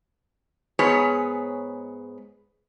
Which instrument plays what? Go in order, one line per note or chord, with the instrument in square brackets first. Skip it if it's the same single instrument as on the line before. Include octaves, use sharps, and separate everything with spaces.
[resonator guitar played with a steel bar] G#2 B3 G#4 C#5